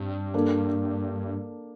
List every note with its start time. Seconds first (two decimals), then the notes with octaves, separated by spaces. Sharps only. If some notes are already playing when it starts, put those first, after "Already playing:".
Already playing: G2 G3 C4
0.34 A#3 D4 A4